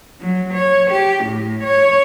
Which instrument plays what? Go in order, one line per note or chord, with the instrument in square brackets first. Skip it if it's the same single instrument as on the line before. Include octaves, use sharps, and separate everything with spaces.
[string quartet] F#3
C#5
G4
A2
C#5